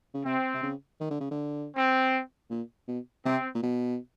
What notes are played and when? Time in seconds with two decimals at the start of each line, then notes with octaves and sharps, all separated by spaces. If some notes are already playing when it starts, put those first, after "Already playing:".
0.14 C#3
0.25 C3 C4
0.54 C3
0.63 C#3
1.00 D#3
1.10 D3
1.21 C#3
1.31 D3
1.76 C4
2.50 A#2
2.88 B2
3.25 C3 C4
3.55 A#2
3.63 B2